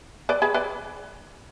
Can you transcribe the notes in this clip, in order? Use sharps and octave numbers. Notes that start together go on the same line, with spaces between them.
B4 D5
G#4 B4
B4 D5